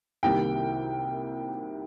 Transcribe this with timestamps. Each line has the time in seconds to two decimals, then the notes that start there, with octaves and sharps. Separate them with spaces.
0.23 C2 C3 D#3 G3 A#3 G5